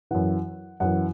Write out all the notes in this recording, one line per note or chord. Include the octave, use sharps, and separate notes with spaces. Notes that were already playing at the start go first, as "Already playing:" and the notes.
F#2 E3 F#5
F#2 E3 F#5